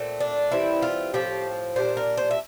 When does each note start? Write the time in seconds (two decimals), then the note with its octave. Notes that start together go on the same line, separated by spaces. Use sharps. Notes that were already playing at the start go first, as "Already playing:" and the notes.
Already playing: A#2 A3 C4
0.20 D4
0.52 E3 G3 C4 E4
0.82 F4
1.14 A2 F3 C4 G4
1.76 A#2 G3 D4 C5
1.97 A#4
2.17 C5
2.31 E5